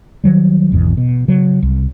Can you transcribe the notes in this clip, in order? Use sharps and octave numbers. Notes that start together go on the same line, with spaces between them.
D#3 F#3 G3
G#1 E2 B2
B2
C#3 F#3
C2